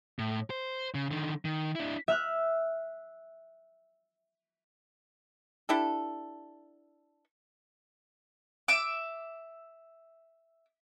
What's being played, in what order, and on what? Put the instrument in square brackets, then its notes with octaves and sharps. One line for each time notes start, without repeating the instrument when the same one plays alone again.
[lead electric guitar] A2
C5
C#3
D3 D#3
D#3
D4 E4
[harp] E5 F6 F#6
[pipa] D4 E4 G4 A4
[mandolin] E5 D6